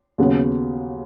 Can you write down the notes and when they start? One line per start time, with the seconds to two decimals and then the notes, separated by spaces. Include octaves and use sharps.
0.18 D#2 C#3 F#3 B3